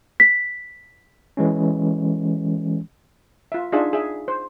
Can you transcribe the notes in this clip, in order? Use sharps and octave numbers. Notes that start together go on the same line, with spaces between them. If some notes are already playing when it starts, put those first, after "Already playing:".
B6
E3 G#3 C#4
F4 E5
D4 D#4 F4 G#4 E5
G#4 E5
C5